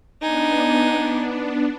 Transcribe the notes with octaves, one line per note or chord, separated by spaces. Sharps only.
B3 D4 D#4 G#5